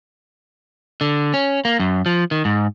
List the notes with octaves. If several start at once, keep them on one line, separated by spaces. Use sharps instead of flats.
D3
C#4
A#3
F#2
F3
D#3
G#2